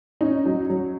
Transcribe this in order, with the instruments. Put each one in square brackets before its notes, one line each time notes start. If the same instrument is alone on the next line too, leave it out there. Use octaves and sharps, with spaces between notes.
[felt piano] C#4 [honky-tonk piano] D#4
[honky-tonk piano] F#3
F#3